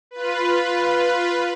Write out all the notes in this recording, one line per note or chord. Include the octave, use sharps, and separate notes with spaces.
F4 B4